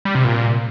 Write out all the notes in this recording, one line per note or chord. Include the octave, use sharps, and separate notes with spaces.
G3
C3
A#2